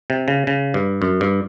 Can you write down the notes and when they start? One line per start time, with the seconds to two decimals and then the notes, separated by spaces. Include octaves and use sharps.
0.10 C3
0.28 C#3
0.47 C#3
0.74 G2
1.02 F#2
1.21 G2